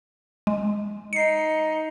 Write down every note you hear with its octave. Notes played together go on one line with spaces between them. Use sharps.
G#3
D#4 C7 C#7